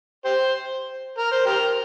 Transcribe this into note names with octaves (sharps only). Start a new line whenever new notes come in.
G4 C5
A#4
C5
G4 A#4